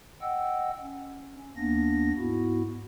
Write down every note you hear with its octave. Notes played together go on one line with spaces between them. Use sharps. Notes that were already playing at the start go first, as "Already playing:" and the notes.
D#5 F#5 G5 E6
C#4
D#2 A#3 B3 D4 A#6
G#2 B3 E4 F#4